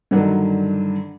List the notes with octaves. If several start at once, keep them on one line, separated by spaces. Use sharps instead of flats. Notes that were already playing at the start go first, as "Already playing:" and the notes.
G2 D3 D#3 F#3